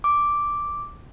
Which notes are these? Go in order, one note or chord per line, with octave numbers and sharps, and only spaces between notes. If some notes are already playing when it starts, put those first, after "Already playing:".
D6